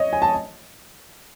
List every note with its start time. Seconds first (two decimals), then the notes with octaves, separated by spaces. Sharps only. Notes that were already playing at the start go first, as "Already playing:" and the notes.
Already playing: C#5 D#5
0.13 G#5
0.22 A5